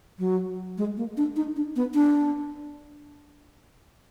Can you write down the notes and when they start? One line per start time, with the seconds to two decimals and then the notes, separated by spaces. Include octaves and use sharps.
0.19 F#3
0.78 G#3
0.97 A#3
1.17 D4
1.36 D#4
1.56 D4
1.76 B3
1.95 D4